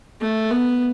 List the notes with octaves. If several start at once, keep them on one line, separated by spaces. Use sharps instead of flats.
A3
B3